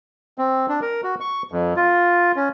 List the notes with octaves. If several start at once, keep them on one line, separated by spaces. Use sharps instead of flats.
C4
D4
A#4
F#4
C#6
F2
F4
C#4